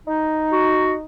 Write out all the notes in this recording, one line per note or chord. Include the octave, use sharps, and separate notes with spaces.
D#4
F#4